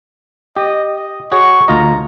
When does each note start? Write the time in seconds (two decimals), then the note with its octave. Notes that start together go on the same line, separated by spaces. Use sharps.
0.57 G4 D#5
0.95 D#5
1.32 F#4 G#4 C#5 C#6
1.68 D2 F4 D#5 A#5